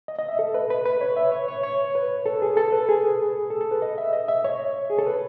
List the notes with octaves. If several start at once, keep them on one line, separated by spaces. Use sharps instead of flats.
D#5
D#5
E5
A4
B4
B4
B4
C#5
E5
C#5
C#5
C#5
B4
A4
G#4
A4
B4
G#4
A4
A4
B4
D#5
E5
D#5
E5
C#5
G#4
A4
B4